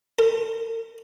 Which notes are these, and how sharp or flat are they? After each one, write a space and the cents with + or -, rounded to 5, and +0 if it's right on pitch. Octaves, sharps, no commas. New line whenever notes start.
A#4 -45